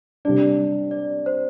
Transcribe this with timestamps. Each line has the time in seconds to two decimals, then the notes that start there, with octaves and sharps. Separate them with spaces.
0.25 C3 G3 D4 D5
0.91 D5
1.26 C5